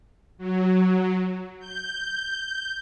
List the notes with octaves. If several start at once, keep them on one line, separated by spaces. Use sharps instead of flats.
F#3
G6